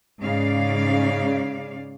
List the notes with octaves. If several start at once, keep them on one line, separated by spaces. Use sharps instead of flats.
G#2 C#3 D5 F5